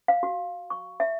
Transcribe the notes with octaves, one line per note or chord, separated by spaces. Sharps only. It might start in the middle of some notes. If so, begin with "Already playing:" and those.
F5
F#4
C#6
E5